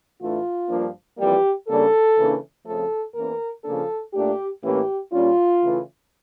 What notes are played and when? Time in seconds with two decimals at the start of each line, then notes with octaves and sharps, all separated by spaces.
0.20 A2 E3 A3 D4 F4
0.69 G2 F3 A#3 D4
1.18 F2 E3 G3 A#3 G4
1.68 C#3 G3 A#3 D4 A4
2.17 C#3 E3 A#3 D4
2.66 F2 C#3 F3 A3 A4
3.15 E2 E3 A#3 C#4 A#4
3.64 C#3 F3 A#3 D4 A4
4.14 A#2 A3 D4 G4
4.62 A2 E3 A#3 C#4 G4
5.12 A#2 G3 C#4 F4
5.61 C#3 E3 A3